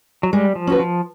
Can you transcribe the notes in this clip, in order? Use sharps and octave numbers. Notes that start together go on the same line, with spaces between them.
F#3
G3 G#3
F3
C#4 F#4 B4
F3